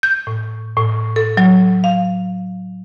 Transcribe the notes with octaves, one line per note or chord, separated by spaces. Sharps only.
G6
A2
A2
A4
F#3
F5